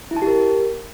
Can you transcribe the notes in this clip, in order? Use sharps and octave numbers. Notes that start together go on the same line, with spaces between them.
E4
A5
G4
A#4